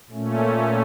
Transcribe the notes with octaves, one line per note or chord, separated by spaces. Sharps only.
A#2 A3 C#4